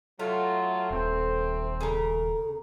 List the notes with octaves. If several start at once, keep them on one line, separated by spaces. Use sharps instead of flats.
F#3 A3 F4 E5
D#1 C4 C5
C#3 A4 A#4